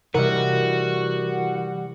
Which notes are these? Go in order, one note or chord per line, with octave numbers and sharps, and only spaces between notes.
C3 E3 G3 E4 F#4 A#4 D#5